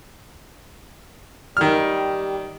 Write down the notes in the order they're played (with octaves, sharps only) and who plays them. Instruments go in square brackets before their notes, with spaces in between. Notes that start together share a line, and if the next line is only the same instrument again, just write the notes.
[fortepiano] D#3 F6 [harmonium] G3